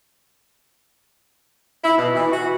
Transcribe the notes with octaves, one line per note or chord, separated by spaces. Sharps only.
E4
B2
E3
F#4